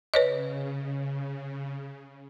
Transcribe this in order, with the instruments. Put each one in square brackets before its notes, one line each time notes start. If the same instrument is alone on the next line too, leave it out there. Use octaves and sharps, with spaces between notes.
[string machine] C#3 [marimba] B4 C#5 D#5